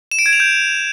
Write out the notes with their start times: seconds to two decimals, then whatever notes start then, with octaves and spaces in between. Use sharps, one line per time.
0.11 E7
0.19 D7
0.26 G#6
0.33 F7
0.40 G6